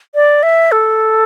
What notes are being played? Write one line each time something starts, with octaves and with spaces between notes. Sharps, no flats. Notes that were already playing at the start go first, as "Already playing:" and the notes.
D5
E5
A4